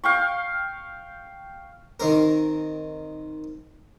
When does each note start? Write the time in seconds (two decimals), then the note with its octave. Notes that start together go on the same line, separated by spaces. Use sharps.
0.04 F5 G5 C#6
2.00 D#3 C4 A#4